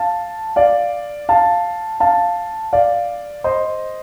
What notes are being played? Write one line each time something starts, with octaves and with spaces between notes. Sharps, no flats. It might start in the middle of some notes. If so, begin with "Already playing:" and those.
Already playing: F5 A5
D5 F5
F5 A5
F5 A5
D5 F5
C5 D#5